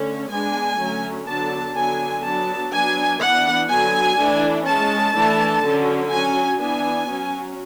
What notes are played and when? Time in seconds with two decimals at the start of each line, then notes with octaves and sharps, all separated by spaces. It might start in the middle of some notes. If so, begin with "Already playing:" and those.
Already playing: D3 A3 C#4
0.29 G#3 B3 D4 G#5
0.78 D3 F#3 A3 C#4
1.27 D3 F#3 B3 D4 A5
1.75 D3 F#3 B3 D4 G#5
2.23 F#3 B3 D4 A5
2.72 F#3 B3 D4 G#5
3.20 E3 B3 D4 F#5
3.68 D3 F#3 B3 G#5
4.17 E3 A3 D4
4.66 G#3 C#4 A5
5.14 E3 A3 D4
5.63 D3 F#3 C#4
6.10 F#3 C#4 G#5
6.59 E3 B3 D4 G#5
7.08 F#3 C#4